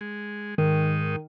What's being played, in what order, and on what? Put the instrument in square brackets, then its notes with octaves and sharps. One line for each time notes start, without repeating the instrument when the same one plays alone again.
[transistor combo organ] G#3
[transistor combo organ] G#2 D#4 [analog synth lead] D#3